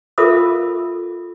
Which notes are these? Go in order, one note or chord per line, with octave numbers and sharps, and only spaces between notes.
F4 A4 A#4 E5 F5 D#6